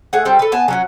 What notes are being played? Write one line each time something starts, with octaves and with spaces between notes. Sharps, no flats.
A3 G#4 F#5
G3 C4 A4
A4 B4
B3 G#5 A5
F#3 C#4 F#4